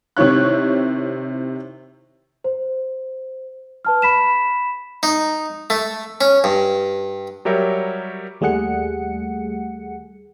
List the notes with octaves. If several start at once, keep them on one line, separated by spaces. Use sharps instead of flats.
C3 D#3 E4 C#5 F#6
C5
B4 A5 F6
B5 B6 E7
D#4
A3
C#4
G2
F#3 G3 G4 A#4 C#5 E5
D#2 G3 A3 G#4 F#5 C#7